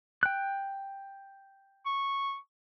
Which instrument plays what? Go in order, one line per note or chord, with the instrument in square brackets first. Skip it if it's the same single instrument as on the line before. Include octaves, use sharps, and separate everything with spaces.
[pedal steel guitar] G5 F#6
[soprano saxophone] C#6